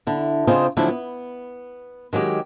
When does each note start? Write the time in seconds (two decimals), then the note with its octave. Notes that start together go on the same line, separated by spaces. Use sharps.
0.07 D3 E4
0.47 C#3 C4 F4 G#4 C5 D#5
0.77 D3 F3 F#3 A3 C#4 E4
0.89 B3
2.13 D#3 F#3 G#3 G4